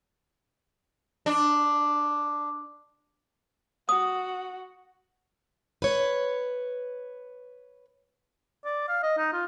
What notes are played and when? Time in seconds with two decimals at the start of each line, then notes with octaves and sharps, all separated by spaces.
1.26 D4
3.89 F#4 D#6
5.82 B4 C#5
8.64 D5
8.88 F5
9.03 D#5
9.18 D#4
9.33 F4